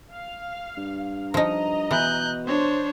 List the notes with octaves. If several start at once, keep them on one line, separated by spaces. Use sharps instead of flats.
F5
G2
F3 D#4 D#5 A#5
B2 E3 F#6 G6
D4 C5 C#5